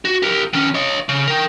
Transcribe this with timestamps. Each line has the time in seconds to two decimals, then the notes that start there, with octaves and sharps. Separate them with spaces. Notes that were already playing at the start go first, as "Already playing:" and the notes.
0.05 F#4
0.22 G4 A#4
0.53 D#3 C#4
0.74 C#5 D#5
1.09 C#3
1.27 A#4 G5